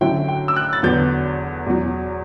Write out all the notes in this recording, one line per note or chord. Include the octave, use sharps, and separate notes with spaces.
D3 F#3 C#4 E4 G5
G5
E6
F#6
A6
E2 D3 F#3 B3 G6
E2 B2 F#3